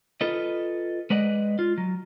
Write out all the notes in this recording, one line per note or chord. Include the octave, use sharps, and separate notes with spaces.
F4 A4 B4 D#5
G#3 B4 D5 D#5 F#5
F4
F#3